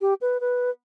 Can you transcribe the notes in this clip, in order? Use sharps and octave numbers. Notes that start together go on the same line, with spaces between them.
G4
B4
B4